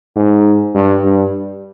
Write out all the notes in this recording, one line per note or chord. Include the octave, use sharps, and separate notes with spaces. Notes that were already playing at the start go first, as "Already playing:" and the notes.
G#2
G2
G2